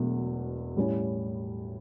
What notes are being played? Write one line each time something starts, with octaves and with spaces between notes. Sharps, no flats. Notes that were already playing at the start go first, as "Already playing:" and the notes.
Already playing: E1 E2 B2 F#3 A3
A2 G3 C#4 E4